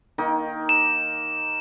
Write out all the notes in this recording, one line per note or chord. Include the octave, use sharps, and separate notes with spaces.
D#3 A#3 D#4
E7